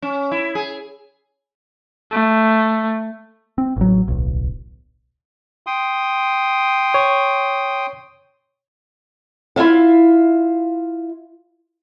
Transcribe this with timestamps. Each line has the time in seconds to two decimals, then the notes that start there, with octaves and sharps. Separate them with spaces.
0.02 C#4
0.31 E4
0.55 G#4
2.11 A3
3.58 C4
3.76 A1 F#3
4.08 D1 B1
5.67 G5 C6 D#6
6.94 C#5 C#6
9.56 E4 F4 E5 F5